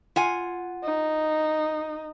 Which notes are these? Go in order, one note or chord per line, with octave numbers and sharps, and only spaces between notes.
F4 F#5 G#5
D#4